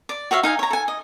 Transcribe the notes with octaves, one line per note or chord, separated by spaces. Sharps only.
D5
F#4 C#5 E5 F5
D#4 F5 G#5
C#5 A#5
A4 G#5
D#5